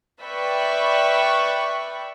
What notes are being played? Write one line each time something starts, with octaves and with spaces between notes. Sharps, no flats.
B4 D5 E5 G5 B5 C#6